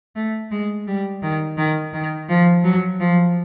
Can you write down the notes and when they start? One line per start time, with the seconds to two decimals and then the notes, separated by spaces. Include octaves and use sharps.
0.16 A3
0.51 G#3
0.87 G3
1.23 D#3
1.58 D#3
1.93 D#3
2.29 F3
2.64 F#3
3.00 F3